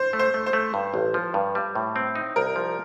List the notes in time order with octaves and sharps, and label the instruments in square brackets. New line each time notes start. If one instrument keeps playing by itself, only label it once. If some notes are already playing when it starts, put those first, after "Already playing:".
Already playing: [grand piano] C5
[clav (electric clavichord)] A3
[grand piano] C5
[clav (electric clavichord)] A3
[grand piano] C5
[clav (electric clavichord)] A3
G2
A1
F3
G2
G3
A2
C4
D#4
[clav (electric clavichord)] C2 [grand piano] A#4
[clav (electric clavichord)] F3